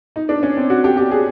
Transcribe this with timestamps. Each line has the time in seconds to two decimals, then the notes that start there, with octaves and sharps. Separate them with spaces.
0.16 D#4
0.29 D4
0.43 C#4
0.57 C4
0.70 F#4
0.84 G4
0.97 G4
1.11 G#4